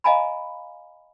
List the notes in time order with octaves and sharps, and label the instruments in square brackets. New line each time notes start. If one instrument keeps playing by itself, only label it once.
[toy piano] D#5 F5 G#5 A#5 B5